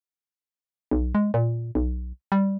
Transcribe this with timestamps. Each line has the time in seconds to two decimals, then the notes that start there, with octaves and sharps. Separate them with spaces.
0.91 B1
1.15 G#3
1.34 A#2
1.75 B1
2.32 G3